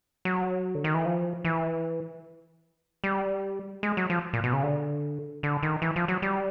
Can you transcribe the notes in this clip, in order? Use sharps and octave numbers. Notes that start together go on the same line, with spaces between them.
F#3
D3
D#3
E3
F3
E3
G3
G#3
F#3
F3
A#2
B2
C#3
D3
D3
D#3
E3
F3
F#3
G3